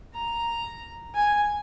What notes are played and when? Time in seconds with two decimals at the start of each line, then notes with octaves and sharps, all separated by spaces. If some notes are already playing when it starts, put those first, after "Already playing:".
0.14 A#5
1.14 G#5